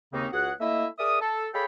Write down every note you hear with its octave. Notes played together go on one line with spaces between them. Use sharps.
D#2 C#3 A#3 C4 C#4 D#4
C#2 F#4 G#4 F#5
A3 A#3 E4 D#5 E5
G#4 A#4 D5 E5 D#6
A4
G#4 A4 C#5 F5 G5 B5